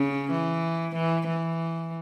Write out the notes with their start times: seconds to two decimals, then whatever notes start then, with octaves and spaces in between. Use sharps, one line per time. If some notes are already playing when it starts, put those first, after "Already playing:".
Already playing: C#3
0.31 E3
0.95 E3
1.27 E3